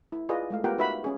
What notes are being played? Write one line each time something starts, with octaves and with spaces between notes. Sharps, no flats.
E4
F4 G#4 B4 D5 D#5
G#3 A3 F5
B3 F4 G4 A#4 F#5 G5
D#4 F#4 B4 E5 F5 B5
C#4 G#4